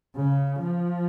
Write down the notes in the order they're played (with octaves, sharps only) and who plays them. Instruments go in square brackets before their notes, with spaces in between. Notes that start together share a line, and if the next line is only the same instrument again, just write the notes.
[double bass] C#3
F3